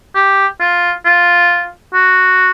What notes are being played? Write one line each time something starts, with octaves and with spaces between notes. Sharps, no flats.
G4
F4
F4
F#4